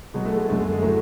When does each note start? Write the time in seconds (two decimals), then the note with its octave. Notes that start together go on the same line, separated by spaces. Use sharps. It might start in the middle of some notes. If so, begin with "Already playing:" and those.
0.14 B2 F#3 G#3
0.25 A3
0.36 G#3
0.49 F#2 D3 G#3 A3
0.59 G#3
0.71 G#3
0.82 A2 F#3 A3